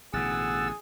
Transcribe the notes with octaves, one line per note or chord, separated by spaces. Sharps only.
A1 B2 D3 G#4 F#5 E6 A6